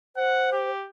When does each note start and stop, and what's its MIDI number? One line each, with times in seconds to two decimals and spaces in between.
0.16 0.70 72
0.16 0.50 78
0.52 0.87 67